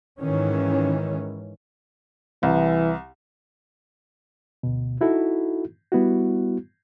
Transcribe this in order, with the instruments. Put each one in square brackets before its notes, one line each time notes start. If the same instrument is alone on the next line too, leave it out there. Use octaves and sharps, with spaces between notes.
[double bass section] G#2 D#3 E3 C#4
[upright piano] C2 [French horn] E3
[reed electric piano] D2 B2
D#4 E4 F#4 A4
G3 B3 E4 F#4